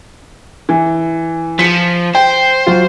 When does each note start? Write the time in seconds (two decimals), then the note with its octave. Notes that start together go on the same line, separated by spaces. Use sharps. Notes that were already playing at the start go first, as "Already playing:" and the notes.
0.69 E3
1.59 F3 B6 C#7
2.15 C5 G5
2.66 F#3 F4